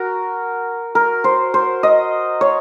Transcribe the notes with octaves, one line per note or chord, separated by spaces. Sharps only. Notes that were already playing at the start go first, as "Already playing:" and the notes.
Already playing: F#4 A#4
A#4
C5
C5
D#5
C#5